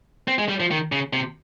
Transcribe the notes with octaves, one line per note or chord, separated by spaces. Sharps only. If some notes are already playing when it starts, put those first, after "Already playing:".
C4
G#3
G3
F3
D#3
C#3
C3